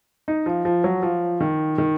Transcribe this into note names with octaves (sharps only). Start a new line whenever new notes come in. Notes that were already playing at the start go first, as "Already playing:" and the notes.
D#4
F3
F3
F#3
F3
D#3
D#3